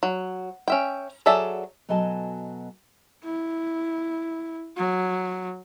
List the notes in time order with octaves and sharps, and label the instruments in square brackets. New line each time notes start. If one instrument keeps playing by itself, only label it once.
[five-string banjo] F#3
C#4 E5 G5
F#3 G#4 A4 D5 E5
[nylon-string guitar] B2 F#3 A4 D#5 G#5 A5
[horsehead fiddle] E4
F#3